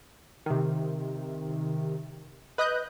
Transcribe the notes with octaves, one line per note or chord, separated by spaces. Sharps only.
C3 D#3
B4 D#5 D#6 F#6 G6